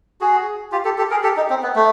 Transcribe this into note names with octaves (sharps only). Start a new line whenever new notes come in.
F#4 G#4
F4 G4
G4 A4
G4 A4
G#4 A#4
G4 A4
D#4
C4
B3
A3